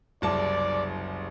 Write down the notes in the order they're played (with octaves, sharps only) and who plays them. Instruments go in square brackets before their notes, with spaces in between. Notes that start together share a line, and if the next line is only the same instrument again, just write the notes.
[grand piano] F#1 C2 A5 [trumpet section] D5